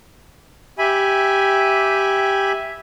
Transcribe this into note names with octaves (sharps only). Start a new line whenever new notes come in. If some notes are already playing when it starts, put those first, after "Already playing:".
G4 E5 G#5 B5